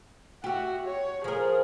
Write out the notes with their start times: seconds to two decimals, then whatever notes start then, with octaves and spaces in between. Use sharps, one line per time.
0.44 F#4 G4 E5
0.86 C#5
1.24 F3 G#4 A#4